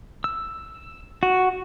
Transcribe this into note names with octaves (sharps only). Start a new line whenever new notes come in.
E6
F#4